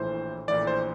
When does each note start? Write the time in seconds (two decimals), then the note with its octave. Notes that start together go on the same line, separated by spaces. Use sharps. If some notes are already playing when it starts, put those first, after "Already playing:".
Already playing: A#1 A2 E3 C5
0.48 A#1 A2 E3 D5
0.67 C5